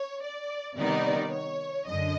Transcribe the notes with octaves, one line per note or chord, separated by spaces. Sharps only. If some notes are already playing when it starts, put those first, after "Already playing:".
Already playing: C#5
D5
C3 D#3 G3 B3 D#4 D5
C#5
F#2 D3 D#5